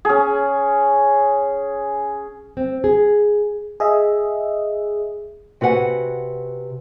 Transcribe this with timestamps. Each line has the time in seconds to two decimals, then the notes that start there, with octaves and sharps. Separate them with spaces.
0.05 C#4 G#4
2.57 C4
2.84 G#4
3.80 G#4 D#5 E5
5.61 C3 F#4 B4 F#5 G#5